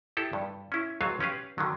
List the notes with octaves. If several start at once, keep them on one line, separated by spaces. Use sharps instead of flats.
E4 G4 A4
G2
C#4 E4
C#2 F#3 C4 A4 F5 G#5
C#4 G4 B4 F5
D3 D#3 F#3